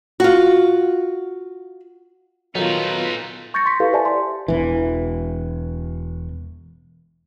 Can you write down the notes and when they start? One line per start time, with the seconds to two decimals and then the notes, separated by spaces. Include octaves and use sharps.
0.20 F4 F#4
2.55 A#2 D#3 F#3 B3 D#4 F4 A4 B4
3.54 C#6 G6 A6 A#6 C#7
3.66 C6 B6
3.80 E4 G4 A4 B4 F5
3.93 G4 C5 D5 E5 G#5 A5
4.05 C6
4.48 E1 E3